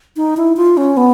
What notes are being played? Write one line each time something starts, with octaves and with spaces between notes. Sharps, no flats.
D#4
E4
F4
C#4
B3